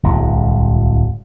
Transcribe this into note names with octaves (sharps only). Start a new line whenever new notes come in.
D1 C2 G2 G#3